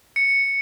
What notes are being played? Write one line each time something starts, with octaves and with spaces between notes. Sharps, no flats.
C#7